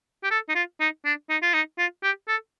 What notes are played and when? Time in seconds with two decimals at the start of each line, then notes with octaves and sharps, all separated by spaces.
0.24 G4
0.31 A4
0.49 D#4
0.55 F4
0.80 D#4
1.05 D4
1.29 D#4
1.43 F4
1.54 D#4
1.78 F4
2.03 G4
2.28 A4